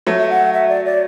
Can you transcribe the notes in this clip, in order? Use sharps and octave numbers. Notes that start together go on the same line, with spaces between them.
F#3 A3
E5
F#5
E5
D5
D5